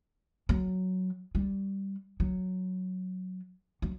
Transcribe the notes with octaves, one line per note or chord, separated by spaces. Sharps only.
F#3
G3
F#3
F#3